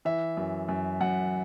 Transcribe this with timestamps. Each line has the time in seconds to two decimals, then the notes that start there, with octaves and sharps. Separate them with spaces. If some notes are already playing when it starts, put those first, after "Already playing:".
0.05 E3 E5
0.37 F#2
0.69 F#2
1.01 F#2 F#5